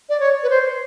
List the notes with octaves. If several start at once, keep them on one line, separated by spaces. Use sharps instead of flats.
D5
C#5
B4
C5